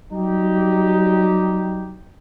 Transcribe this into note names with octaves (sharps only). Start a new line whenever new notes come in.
F#3 G3 D#4 G4